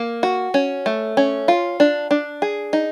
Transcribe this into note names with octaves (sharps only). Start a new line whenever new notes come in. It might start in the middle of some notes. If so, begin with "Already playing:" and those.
Already playing: A#3
F#4
C#4
A3
C#4
F4
D4
D4
G#4
D#4